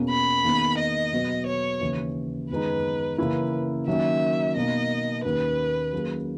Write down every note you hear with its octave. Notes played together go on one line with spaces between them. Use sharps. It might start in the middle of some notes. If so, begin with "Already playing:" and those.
Already playing: E2 B2 A#3 C#4
B5
E2 D#3 A#3
D#5
E2 B2 F#3 B3 F#4
C#5
D#2 C#3 E3
F#2 D#3 G#3 B3 D#4 B4
C#3 E3 A#3 C#4 E4 B4
D#3 F#3 A#3 C#4 E5
B2 A#3 D#4 D#5
D#2 D#3 A#3 C#4 B4
D#3 F#3 A#3 C#4 G#4